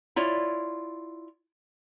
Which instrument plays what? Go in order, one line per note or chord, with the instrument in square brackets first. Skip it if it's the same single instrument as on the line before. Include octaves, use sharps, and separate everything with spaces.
[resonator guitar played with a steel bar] E4 F4 C#5 D5